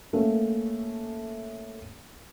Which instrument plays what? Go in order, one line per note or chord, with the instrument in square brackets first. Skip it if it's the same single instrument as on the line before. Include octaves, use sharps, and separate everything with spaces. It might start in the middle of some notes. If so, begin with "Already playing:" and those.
[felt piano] A3 A#3 C#4